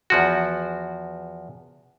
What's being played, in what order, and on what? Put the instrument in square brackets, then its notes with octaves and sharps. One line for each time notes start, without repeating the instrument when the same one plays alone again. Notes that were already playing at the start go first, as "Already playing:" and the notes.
[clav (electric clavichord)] E2 F3 F#4